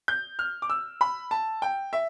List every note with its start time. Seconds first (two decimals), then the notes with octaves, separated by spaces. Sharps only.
0.08 G6
0.39 F6
0.62 D6
0.70 E6
1.01 B5
1.31 A5
1.62 G5
1.93 E5